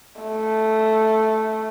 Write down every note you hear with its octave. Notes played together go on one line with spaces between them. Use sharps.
A3